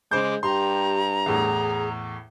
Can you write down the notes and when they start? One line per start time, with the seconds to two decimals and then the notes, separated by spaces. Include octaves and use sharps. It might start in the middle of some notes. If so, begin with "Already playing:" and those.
0.11 C#3 G#3 C5 D6 G6
0.43 G2 G4 A#5 C6
1.26 E2 A2 G#4